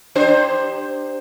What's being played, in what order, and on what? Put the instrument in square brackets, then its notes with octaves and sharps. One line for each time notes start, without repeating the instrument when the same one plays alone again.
[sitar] D4 G4 C5